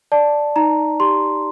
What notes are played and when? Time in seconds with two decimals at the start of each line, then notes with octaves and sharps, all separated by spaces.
0.12 D5 A5
0.56 D#4 A#5
1.00 G4 C6